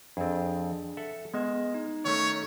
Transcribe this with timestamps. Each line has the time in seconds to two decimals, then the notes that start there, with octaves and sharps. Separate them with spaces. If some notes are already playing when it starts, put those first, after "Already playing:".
0.17 F2 C4 D4 G#4
0.97 A4 E5 F#5
1.34 G#3 B3 D#5
1.74 D#4
2.05 D#3 A3 C#4 C#5